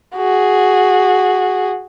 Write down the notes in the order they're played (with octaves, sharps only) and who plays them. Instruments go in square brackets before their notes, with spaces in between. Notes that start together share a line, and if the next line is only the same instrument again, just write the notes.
[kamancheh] F#4 G#4